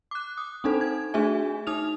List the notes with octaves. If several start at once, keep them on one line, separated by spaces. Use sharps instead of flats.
D6 F#6
D#6
C4 D4 D#4 A4 C5
G#6
A3 D4 F#4 G#4 E5 G#5
D#4 D#6 F6 F7